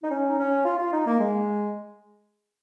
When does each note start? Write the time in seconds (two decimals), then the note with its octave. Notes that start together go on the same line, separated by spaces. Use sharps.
0.04 D#4
0.11 C#4
0.29 D#4
0.39 C#4
0.65 F4
0.79 F4
0.93 D#4
1.07 A#3
1.20 G#3